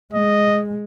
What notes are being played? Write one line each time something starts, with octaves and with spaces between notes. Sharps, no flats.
G#3 D#5